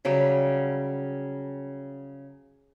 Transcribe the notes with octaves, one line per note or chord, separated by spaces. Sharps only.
C#3 F#3 G3 G4